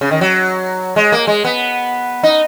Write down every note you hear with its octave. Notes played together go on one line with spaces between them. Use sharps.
C#3
D#3
F#3
G#3
A#3
G#3
B3
D#4